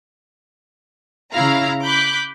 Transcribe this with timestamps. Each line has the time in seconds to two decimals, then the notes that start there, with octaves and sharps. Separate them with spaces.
1.32 C#3 E4 F5 A#5
1.84 B5 D6 F#6 G6